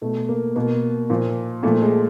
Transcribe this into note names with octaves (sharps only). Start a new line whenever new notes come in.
B2 A3
A#3
B2 A#3
A#2 F3
A#2 F3 A3
G#3